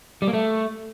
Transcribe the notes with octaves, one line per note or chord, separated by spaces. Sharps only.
G3
A#3
A3